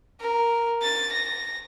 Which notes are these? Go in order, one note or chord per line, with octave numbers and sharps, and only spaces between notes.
A#4
A6
A#6